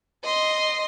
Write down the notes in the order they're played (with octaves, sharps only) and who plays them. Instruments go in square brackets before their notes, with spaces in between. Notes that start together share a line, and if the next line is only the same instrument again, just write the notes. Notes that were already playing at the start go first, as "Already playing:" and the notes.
[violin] D#5 C6